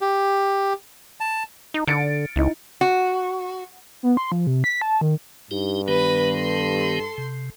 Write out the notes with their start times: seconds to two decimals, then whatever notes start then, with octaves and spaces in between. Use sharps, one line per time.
0.01 G4
1.20 A5
1.74 D#4
1.88 D3 A6 C#7 D7
2.36 C#2 D#4 E4
2.81 F#4
4.03 B3
4.17 C6
4.32 F3
4.47 C3
4.64 B6
4.82 A5
5.01 D#3
5.51 G2 D#4 G4
5.88 D#3 B3 G4 B4 B5
6.34 A4 C6
7.18 C3